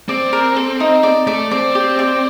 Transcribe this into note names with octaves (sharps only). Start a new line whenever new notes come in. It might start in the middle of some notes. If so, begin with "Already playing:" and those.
C4 D5
A#4
A4
D#4
D5
A3 D5
C4 D5
G4
D5